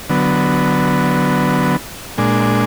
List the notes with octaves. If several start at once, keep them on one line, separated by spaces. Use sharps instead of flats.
D3 F#3 B3
A#2 G#3 D4